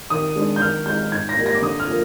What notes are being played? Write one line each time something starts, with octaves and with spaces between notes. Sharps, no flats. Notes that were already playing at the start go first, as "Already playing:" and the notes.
D#3 D#6
G#3 D4
G6
D#3 F6
G#3 D#4 G6
G#2 G#6
A#6
G3 A#3 D#4
A#6
D6
D3 D#6
F6
F3 A#3